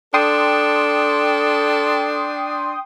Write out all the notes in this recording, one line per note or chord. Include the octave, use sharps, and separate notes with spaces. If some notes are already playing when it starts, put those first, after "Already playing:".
D4 A4 G5 C6 D#6